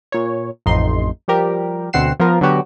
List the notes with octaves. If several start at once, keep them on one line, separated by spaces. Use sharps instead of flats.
A#2 C#5
A1 F2 D#4 C6
F3 G3 G4 A#4
D2 B2 C4 F#5 C7 E7
F3 B3 F4 A#4
D3 F#3 B3 F#4 G4